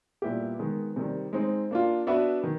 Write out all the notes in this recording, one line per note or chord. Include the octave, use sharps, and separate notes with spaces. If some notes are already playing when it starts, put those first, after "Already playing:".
A#2 G3 B3 E4 G4
D#3 G#3 B3
C3 D#3 G3
G#3 C4 D#4
A#3 D4 F4
B3 D4 F#4 B4 E5
D#3